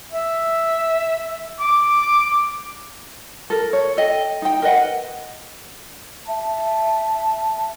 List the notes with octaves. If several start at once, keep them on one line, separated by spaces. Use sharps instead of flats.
E5
D6
A4 A#4
C#5
A4 D#5 G5
D#4 G5
A#4 B4 D#5 F#5
E5 A5